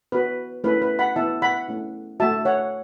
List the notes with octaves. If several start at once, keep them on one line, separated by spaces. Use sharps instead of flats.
B3 F#4 B4
A3 C#4 E4 B4
B4
F#5 B5
B3 E4 E5 A5
F#5 B5
A3 C#4 E4
A3 F#4 E5 A5
C#5 F#5